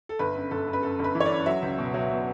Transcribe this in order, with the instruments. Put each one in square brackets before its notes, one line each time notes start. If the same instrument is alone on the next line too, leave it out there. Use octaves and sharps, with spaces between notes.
[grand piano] A4
G1 B4
F#2
G1 A4
F#2
B4
F#2 A4
G1
B4
E3
C#5
D5
F#2
F#3 E5
C#2
B2
F#3
B2